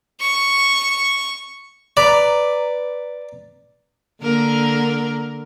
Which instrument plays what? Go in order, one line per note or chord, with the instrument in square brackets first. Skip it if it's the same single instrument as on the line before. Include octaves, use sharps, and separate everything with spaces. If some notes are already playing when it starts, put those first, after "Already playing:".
[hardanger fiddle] C#6
[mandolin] B4 A#5 D6 [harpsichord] D5
[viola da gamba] D3 A#3 A#4